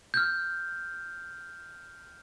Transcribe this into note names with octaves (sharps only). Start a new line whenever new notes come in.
F6 G6